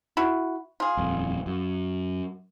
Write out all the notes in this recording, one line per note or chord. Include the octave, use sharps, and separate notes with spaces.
E4 F#4
F4 G#4
D#1 F2
F#2